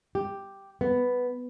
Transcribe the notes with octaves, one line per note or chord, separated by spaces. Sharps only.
G4
B3